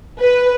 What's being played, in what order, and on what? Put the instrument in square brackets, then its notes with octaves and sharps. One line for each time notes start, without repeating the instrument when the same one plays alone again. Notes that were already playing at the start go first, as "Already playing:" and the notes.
[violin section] B4